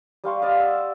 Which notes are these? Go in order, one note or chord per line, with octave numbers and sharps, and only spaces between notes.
G3 F5 C6 C#6
D5 D#5 F5
E5 F#5